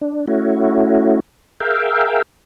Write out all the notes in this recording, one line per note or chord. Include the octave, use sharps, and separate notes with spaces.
D4
A3 C#4 E4 F#4
G#4 A#4 E5 F5 G5